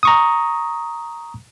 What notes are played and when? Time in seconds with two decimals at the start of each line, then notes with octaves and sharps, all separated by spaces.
0.03 A#5 C#6 D#6